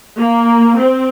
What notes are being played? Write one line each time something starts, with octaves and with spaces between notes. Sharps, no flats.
A#3
C4